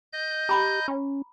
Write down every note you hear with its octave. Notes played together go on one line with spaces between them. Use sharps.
D#5 G6
G4 A#5 B5 D6
C#4